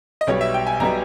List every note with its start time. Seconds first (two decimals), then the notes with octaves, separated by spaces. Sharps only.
0.21 D#5
0.27 B1 B2 G3 C#5
0.41 E5
0.54 G5
0.67 G#5
0.80 B1 B2 G3 A#5